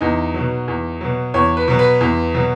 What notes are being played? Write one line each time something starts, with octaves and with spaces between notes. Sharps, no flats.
E2 D#4
B2 F#3
E2
B2 F#3
E2 C#5
B4
B2 F#3
B4
E2
B2 F#3